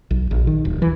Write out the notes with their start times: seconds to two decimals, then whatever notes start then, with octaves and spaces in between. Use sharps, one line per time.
0.11 B1
0.31 A#1
0.47 D#3
0.65 D1
0.82 E3